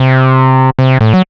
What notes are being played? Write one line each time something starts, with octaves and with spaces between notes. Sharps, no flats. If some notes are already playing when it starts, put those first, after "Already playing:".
Already playing: C3
C3
A2
F#3